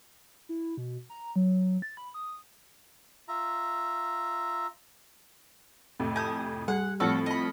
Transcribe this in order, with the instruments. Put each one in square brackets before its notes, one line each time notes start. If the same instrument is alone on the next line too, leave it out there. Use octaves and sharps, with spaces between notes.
[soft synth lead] E4
B2
A#5
F#3
A6
B5
D#6
[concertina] F4 E5 A#5
[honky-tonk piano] F2 A2 C3
[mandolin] G#5 G6 [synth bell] A5 D#6
[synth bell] G3 G4 [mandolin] F#5
[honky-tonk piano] A2 F3 [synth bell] C4 F6 C#7 [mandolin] F#4 A4
[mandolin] D#5 B5